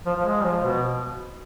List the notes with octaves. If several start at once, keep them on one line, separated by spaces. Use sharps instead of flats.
F3
F3
G#3
F3
B2